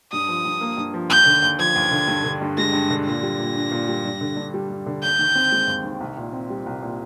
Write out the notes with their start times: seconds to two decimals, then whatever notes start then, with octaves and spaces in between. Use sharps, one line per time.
0.12 G2 D#6
0.29 F3
0.45 G2
0.61 A#3
0.77 G2
0.94 F3
1.09 D#2 G6
1.26 D3
1.43 D#2
1.59 F3 G#6
1.76 D#2
1.91 D3
2.08 G2
2.24 D3
2.41 G2
2.58 G#3 A#6
2.73 G2
2.91 D3
3.06 A#2 A#6
3.23 G3
3.40 A#2
3.56 D4
3.71 A#2
3.88 G3
4.04 G2
4.21 D3
4.37 G2
4.54 G3
4.69 G2
4.86 D3
5.02 D#2 G6
5.19 D#3
5.35 C4
5.52 G#3
5.67 D#2
5.84 D#3
6.01 C2
6.17 A#2
6.33 C4
6.50 G3
6.66 C2
6.82 A#2